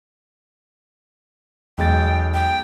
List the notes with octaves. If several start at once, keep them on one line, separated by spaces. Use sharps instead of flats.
B1 E2 G#3 G5 A6
G5